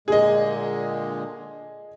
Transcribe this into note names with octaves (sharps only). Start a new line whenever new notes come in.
A#2 D3 G#3 G#4 D#5